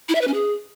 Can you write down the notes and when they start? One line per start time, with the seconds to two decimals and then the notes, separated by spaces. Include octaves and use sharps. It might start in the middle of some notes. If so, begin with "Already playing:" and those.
0.09 E4
0.15 E5
0.21 B4
0.27 C#4
0.34 G#4